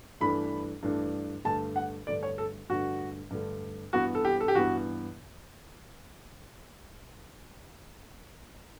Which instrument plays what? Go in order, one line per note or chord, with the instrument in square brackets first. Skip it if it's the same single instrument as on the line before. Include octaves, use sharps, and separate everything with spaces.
[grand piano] G2 E3 A3 D4 B5
G2 E3 A3 D4
G2 D3 A3 A5
F#5
G2 D3 A3 D5
C#5
A4
G2 D3 A3 F#4
G2 D3 A3
G2 E3 B3 F#4
A4
G4
A4
G4
G2 E3 B3 F#4